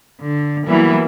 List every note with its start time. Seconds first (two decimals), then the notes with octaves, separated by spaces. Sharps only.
0.20 D3
0.67 E3 F#3 G3 A#3 B3 E4